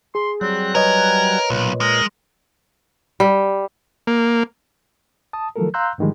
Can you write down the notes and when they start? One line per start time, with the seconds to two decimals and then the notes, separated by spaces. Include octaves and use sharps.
0.15 G#4 C6
0.41 F#3 G3 C4 F#6
0.75 A#4 B4 C#5 D#5 G#5
1.50 B1 A#2
1.81 G#3 A#4
3.20 G3
4.07 A#3
5.33 A5 D#6
5.56 D#3 F3 F#3 A3 A4 A#4
5.74 F5 A#5 C6 E6 F#6 G6
5.98 G#2 D3 D#3 F3 G3 G#3